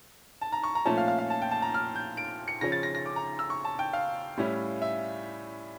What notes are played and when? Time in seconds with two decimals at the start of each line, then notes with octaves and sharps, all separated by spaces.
0.42 A5
0.52 A#5
0.63 C#6
0.75 A#5
0.85 A#2 F3 A3 C#4 A5
0.98 F5
1.08 F5
1.18 F5
1.30 A5
1.42 G5
1.51 A5
1.62 A#5
1.74 F6
1.96 G6
2.17 D7
2.48 C#7
2.61 C#3 F3 C#4 A#6
2.72 A6
2.83 A#6
2.95 A#6
3.06 D6
3.16 A#5
3.39 E6
3.50 C#6
3.65 A5
3.79 G5
3.93 F5
4.38 A2 G3 C#4 E4
4.82 E5